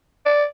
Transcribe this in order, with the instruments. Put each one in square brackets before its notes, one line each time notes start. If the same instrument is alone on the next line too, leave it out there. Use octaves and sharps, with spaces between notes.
[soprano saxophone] D5